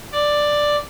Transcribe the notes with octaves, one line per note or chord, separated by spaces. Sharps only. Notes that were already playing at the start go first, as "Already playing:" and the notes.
D5